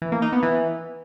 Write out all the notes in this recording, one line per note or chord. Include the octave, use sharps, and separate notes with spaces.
E3
A#3
D#4
B3
E3